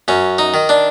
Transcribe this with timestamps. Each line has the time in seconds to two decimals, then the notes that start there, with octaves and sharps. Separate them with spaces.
0.08 F#2 C#4
0.38 D#4
0.54 D#3
0.69 D4